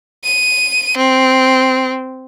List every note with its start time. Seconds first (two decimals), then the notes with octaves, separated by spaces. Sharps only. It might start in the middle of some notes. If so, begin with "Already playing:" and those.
0.24 D#7
0.97 C4